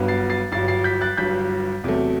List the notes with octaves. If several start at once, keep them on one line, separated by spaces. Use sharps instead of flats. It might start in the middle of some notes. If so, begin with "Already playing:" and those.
Already playing: G1 G2 F#3 B3
A6 C7
A6 C7
G1 G2 F#3 A6 C7
A6 C7
G6 B6
F#6 A6
G1 G2 F#3 G6 B6
E2 C3 F#3 A3